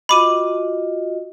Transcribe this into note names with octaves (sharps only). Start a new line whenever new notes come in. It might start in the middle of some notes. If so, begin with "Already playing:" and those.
F4 F#4 D#5 B5 D6 D#7